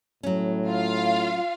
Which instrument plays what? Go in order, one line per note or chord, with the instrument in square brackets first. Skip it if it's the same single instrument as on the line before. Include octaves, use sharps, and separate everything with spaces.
[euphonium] A2 [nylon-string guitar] F#3 C#4
[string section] F4 F5